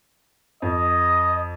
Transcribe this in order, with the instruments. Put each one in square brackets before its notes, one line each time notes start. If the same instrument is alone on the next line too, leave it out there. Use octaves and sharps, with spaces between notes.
[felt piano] F2 [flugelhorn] D#5